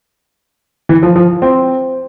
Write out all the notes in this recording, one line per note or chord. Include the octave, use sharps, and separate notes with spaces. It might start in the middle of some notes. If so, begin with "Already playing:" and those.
E3
F3
F3
C4